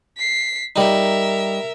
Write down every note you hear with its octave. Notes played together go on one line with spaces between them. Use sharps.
B6 C7
G3 D#4 A#4 E5